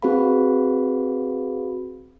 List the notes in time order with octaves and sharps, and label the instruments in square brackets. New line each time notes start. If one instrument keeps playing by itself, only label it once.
[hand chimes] C4 F#4 G#4 B4 F5 B5